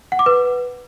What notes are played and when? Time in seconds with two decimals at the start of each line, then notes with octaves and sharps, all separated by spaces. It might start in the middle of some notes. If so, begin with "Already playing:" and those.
0.12 F#5
0.19 D6
0.26 B4